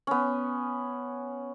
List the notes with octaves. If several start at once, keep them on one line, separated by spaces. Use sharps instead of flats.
B3 C#4